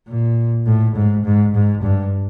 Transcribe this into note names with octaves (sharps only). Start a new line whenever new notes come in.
A#2
A2
G#2
G#2
G#2
G2